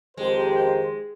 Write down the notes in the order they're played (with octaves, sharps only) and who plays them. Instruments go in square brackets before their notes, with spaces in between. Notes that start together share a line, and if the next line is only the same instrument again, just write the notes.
[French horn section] F2 D#3 G4 [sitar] G#3 [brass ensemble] C5